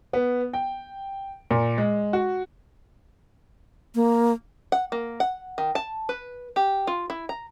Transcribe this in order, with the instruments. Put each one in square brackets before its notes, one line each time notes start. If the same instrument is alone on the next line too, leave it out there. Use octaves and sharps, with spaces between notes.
[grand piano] B3
G5
A#2
G#3
F#4
[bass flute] A#3
[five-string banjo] F#5
A#3
F#5
D#3
A5
B4
G4
F4
E4
A#5